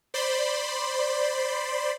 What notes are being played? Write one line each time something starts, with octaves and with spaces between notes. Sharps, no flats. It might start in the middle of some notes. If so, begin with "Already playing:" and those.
C5 D5 B5 C6